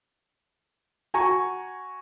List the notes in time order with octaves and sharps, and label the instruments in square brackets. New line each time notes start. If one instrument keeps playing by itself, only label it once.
[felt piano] F#4 G#5 A#5 C#6